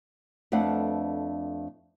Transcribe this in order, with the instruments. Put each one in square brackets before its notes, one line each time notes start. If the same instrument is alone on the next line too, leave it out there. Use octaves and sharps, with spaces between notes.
[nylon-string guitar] F2 A3 D4 B4 F5 F#5